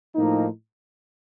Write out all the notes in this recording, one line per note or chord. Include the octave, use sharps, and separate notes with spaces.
A2 F3 A#3 D#4